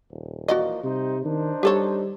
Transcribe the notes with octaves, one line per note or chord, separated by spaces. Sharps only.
D#1
E3 F3 A#3 F#4 D5 D#5
C3 G3 D#4 C5
D#3 D4 D#4 C5
G3 G4 A4 C#5